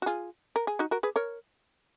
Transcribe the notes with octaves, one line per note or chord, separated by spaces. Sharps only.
F#4
F4 G#4
A#4
G#4
D#4 F#4
F#4 A#4
G#4 B4
A#4 C#5